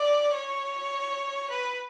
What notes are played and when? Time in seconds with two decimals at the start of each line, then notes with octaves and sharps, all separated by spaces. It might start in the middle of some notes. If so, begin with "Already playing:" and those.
Already playing: D5
0.34 C#5
1.51 B4